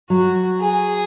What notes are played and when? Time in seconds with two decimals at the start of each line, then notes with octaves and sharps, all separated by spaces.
0.10 F#3 F#4
0.60 G#4